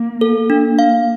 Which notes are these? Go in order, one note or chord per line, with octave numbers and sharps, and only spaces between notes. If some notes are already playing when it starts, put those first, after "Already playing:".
Already playing: A#3
A4
D4
F5